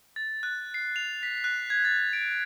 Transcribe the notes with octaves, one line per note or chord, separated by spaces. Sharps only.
A6
F#6
C7
F7
B6
F#6
G#6
A6
D7